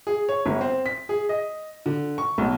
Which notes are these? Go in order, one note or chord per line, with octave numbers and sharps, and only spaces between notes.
G#4
C#5
G1
C4
B6
G#4
D#5
D3
C#6
B1